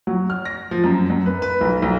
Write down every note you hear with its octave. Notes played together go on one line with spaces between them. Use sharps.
F#3
F6
A#6
F3
F#2
F#2
B4
B4
B1
B1